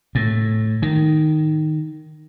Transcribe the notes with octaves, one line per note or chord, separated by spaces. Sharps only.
A2
D#3